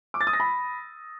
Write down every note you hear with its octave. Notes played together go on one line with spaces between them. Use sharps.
D6
A6
D#6
A#6
B5